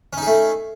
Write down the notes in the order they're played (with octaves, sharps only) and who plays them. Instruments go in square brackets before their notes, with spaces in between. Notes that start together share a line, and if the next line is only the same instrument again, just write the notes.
[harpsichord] C#4
D#4
G#4
A3